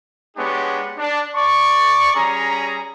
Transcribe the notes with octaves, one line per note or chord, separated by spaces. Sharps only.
G#3 B3 D4 G4 C#5
D4
D5 C#6
G3 C#4 G#4 A#5